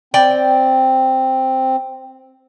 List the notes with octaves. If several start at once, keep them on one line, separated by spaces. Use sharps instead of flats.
C4 D5 G5